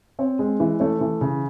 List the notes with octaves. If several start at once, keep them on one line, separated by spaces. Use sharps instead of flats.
C4 C#5
G#3
E3
A3 C#5
E3
C#3